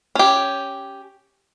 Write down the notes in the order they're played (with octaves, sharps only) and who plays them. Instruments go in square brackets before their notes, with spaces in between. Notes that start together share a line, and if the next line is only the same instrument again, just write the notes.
[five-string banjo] C#4 G4